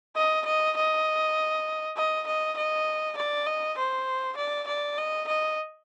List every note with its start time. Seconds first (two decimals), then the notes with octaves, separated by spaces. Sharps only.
0.16 D#5
0.46 D#5
0.77 D#5
1.97 D#5
2.27 D#5
2.57 D#5
3.17 D5
3.47 D#5
3.78 C5
4.37 D5
4.68 D5
4.98 D#5
5.28 D#5